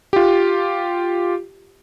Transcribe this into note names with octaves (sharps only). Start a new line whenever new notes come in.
F4 G4